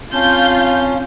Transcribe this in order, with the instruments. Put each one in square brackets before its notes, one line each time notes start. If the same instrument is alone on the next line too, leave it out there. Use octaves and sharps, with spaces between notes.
[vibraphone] C4 A5 [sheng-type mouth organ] C#4 [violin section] F4 F5 [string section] G6